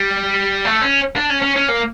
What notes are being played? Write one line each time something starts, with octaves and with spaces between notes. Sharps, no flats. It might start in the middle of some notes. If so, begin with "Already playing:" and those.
Already playing: G3
A3
C#4
D4
C#4
C#4
C#4
A#3